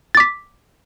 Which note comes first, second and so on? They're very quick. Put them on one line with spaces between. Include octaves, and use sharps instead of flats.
A6 D6 B6